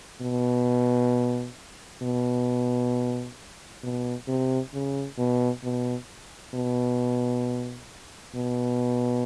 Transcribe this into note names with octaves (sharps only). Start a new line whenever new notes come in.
B2
B2
B2
C3
C#3
B2
B2
B2
B2